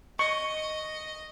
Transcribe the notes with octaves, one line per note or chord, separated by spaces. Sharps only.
D#5 C#6